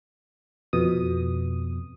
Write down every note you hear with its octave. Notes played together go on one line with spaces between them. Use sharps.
F2 B2 D#6